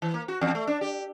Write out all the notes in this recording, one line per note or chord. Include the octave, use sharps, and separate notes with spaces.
E3
A#3
F#4
E2
A3
D4
G4